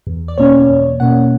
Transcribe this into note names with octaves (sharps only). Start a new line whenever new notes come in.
E2
D5
B2 A#3 C#4 C#5
E2
B2 A#3 C#4 F#5